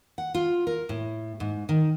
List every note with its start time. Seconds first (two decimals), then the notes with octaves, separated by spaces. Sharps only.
0.18 F#5
0.34 F4
0.67 A#4
0.89 A2
1.40 G#2
1.69 D#3